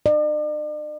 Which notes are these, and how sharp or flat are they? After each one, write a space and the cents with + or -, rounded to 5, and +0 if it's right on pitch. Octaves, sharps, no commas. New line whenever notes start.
D5 +45